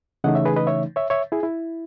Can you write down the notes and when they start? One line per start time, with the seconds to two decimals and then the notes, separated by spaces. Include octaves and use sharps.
0.24 C#3 E3 A3 D#4 D#5 F#5
0.35 C#5 E5
0.45 G#4 B4
0.56 B4 D#5
0.67 C#5 E5
0.96 C#5 E5
1.10 C#5 E5
1.32 E4 G#4
1.43 E4